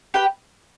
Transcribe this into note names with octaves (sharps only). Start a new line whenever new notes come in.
G4 B4 G5